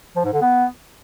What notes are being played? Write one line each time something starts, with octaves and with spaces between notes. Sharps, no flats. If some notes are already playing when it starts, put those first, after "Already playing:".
F3
G#2
D3
B3